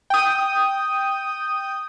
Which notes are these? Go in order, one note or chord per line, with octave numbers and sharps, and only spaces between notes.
G5 D#6